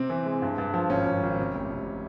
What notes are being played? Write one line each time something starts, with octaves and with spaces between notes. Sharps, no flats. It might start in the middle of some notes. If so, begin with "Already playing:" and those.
Already playing: C3 C4
E3
G#3
G2
G2
F3
G#1 C#4
G#1
G#1
C3
F1
C3